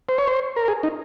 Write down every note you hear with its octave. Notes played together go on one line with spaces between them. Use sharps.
C5
C#5
C5
A#4
G#4
D#4